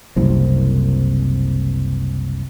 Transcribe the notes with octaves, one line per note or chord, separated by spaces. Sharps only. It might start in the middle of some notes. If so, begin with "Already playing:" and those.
F#1 C2 C4